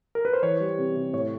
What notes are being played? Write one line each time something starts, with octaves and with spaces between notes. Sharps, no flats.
A#4
B4
C5
E3 C#5
G3
C3
C3
A2 C#5